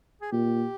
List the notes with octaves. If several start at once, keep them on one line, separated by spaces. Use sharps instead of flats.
G#4
A#2 G4